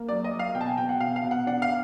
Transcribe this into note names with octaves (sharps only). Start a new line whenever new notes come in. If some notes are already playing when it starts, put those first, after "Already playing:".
Already playing: A#3
F#3 D5
D#5
F#3
F5
B2 G5
A5
G#5
B2 G5
F#5
B2 F5
F5
B2
F#5
D4 F#5
F5